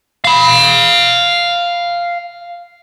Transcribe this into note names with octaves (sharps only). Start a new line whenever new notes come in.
F5 B5